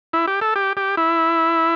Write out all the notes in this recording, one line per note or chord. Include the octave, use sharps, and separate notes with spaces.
E4
G4
A4
G4
G4
E4